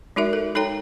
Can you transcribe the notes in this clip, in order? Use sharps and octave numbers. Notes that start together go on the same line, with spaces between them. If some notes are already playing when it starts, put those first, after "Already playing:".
G#3 D#4 F#4 A#4 E5
A4
D#4 A4 C#5 G5 A#5